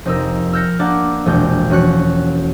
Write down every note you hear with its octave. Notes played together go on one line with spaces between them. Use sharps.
F1 C4 D#4 A#4 E6
E6 F6 G6 A#6 C#7
A#3 B3 D4 D5 F#5
E1 A#1 G#3 D5 G5 G6
E1 C#4 F#4 C#6 F#6 C#7